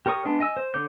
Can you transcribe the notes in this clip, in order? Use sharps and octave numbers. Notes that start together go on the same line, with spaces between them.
G4 A#4 C#5 C#6 D#6
G#3 B3 D4
D#5 G#5 E6
C5
D3 C#5 D6 G6